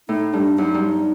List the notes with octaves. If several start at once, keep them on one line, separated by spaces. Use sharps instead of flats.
A2 D#4
G2 D4
F#2 D#4
G2